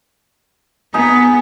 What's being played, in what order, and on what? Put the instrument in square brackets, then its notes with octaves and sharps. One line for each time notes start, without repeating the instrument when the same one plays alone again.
[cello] B3 [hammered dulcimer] D#4 G#4 A#5